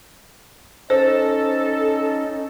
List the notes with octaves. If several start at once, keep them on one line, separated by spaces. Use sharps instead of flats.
C#4 D#4 A4 C5